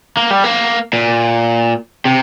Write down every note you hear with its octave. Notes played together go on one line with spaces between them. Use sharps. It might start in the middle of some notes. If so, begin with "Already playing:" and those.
A#3
G3
A#3
A#2
C3